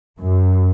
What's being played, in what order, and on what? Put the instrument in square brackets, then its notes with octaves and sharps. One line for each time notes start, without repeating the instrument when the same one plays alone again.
[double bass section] F#2